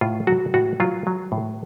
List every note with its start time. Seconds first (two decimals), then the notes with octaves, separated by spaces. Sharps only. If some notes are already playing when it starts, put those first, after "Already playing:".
0.01 A2 F4
0.27 F#3 F#4
0.54 A2 F#4
0.80 F#3 F4
1.07 F#3
1.32 A2